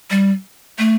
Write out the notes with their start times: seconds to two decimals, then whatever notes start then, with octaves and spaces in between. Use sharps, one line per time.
0.11 G3
0.78 A3